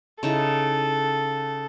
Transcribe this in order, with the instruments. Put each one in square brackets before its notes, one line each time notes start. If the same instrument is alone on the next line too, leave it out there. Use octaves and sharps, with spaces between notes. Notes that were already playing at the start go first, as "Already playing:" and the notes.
[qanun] C#3 D#4 E4 [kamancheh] A4